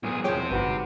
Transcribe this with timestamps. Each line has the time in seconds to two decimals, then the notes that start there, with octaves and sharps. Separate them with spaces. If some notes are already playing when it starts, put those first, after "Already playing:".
0.03 B1 A#2 G#4
0.24 E1 F3 G4 G#4 C5 C#5 G5
0.51 G1 G#2 F#4 B4